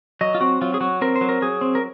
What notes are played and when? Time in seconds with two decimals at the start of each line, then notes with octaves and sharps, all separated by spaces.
0.21 F#3 D#5
0.35 F4
0.41 C4 F#4
0.61 F#3 F4
0.74 G#4
0.81 F#3 F#4
1.01 C4 A#4
1.16 C5
1.21 F#3
1.29 A#4
1.42 F#3 G#4
1.61 C4
1.75 A#4